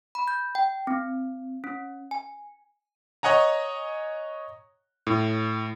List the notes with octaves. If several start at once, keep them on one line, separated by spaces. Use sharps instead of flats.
B5
G6
G5
C4
C#4
G#5
C#5 D#5 F#5 G#5 A#5
A2